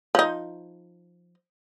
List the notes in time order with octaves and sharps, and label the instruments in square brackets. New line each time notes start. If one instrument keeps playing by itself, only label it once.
[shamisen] F3 D#4